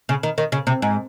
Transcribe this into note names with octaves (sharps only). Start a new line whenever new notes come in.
C#3
D#3
D#3
C#3
C3
G#2